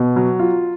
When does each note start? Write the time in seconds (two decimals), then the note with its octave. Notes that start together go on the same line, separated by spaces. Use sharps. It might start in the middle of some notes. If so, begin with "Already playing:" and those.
Already playing: B2
0.16 F#3
0.39 F4